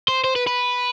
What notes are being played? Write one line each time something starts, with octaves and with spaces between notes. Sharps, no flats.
C5
C5
B4
B4